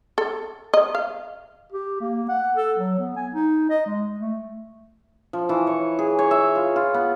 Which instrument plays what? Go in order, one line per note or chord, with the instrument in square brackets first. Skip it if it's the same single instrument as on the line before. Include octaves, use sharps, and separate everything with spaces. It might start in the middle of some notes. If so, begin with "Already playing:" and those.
[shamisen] A4
D#5
F5
[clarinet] G4
A#3
F#5
A4
F#3
B3
G#5
D#4
D#5
G#3
A3
[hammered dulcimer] F3
E3
C#5
G#4
C#5
E5
F4
F4
B3